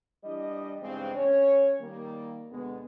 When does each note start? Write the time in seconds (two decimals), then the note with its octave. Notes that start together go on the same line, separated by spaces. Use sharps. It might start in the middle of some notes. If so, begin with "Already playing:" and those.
0.24 E3 G3 D4 E4 D#5
0.81 G2 C#3 E3 G#3 C4
1.15 C#4 C#5
1.80 D#3 G3 A#3
2.52 D2 B2 G#3 B3